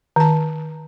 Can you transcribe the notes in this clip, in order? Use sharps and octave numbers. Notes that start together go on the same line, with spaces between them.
D#3 A5